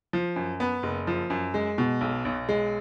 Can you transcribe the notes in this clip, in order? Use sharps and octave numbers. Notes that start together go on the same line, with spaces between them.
F3
F#2
B3
F#1
F3
F#2
G#3
B2
B1
B1
G#3